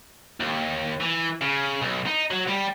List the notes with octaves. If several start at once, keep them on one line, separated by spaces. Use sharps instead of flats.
D#2
E3
C#3
B1
D#4
F#3
G3